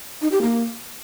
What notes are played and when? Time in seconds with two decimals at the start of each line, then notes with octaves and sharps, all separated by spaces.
0.22 D#4
0.32 G4
0.42 A#3